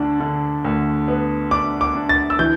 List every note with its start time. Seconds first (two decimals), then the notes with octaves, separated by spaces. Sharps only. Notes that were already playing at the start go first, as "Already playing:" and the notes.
Already playing: D2 D3 D4 A5
0.20 D3
0.65 D2
1.08 B3
1.51 D4 D6
1.81 D6
1.95 D4
2.09 A6
2.30 E6
2.39 E3 G6